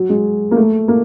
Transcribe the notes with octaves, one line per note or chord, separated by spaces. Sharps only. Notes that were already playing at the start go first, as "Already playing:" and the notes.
Already playing: F#3
G#3
A#3
A3
A#3